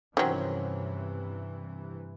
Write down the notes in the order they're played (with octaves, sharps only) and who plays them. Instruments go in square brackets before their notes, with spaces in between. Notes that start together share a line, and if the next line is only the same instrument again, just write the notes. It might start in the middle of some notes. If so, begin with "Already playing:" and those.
[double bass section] G2 C3 E3 [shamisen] D#3 F#3 [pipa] C4 C#4